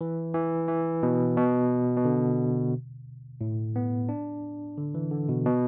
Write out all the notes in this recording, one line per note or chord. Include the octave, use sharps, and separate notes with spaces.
E3
E3
E3
B2
B2
B2
D3
A2
B3
D4
D3
E3
D3
B2
B2